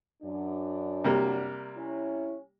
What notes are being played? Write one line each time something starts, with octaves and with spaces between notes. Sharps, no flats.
F#2 D4
C3 G3 A#3
C#4 E4